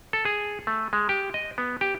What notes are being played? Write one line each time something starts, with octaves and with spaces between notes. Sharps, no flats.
A4
G#4
A3
G#3
G4
D#5
B3
G4